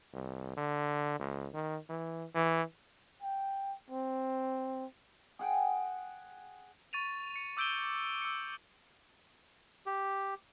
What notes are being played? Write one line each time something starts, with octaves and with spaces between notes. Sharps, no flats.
C2
D3
C#2
D#3
E3
E3
G5
C4
G#4 F#5 G5
C#6 A6 D#7 F7
C#7
D6 E6 G6 D7 D#7 G7
E6 C#7
G4